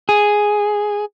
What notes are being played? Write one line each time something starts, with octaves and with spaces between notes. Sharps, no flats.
G#4